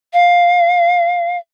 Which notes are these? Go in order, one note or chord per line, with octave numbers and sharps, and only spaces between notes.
F5